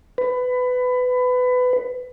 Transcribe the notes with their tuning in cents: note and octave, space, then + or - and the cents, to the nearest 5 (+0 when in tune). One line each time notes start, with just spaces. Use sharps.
B4 +20